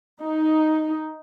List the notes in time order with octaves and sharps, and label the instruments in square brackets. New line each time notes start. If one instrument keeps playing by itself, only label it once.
[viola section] D#4